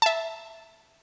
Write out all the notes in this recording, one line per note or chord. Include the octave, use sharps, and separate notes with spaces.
E5 A5